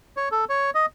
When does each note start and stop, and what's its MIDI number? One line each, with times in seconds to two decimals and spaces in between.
0.17 0.29 73
0.32 0.45 69
0.49 0.70 73
0.75 0.86 75